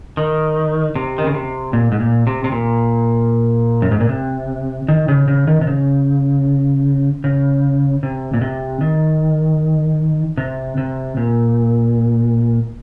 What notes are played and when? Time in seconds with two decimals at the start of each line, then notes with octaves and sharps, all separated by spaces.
0.17 D#3
0.95 C3
1.18 D#3
1.26 C#3
1.34 C3
1.73 A#2
1.92 G#2
2.00 A#2
2.27 C3
2.44 C3
2.52 A#2
3.82 F#2
3.91 G#2
4.00 A#2
4.09 C3
4.88 D#3
5.08 C#3
5.28 C#3
5.47 D#3
5.61 C3
5.67 C#3
7.24 C#3
8.03 C3
8.34 A#2
8.41 C3
8.81 D#3
10.37 C3
10.78 C3
11.17 A#2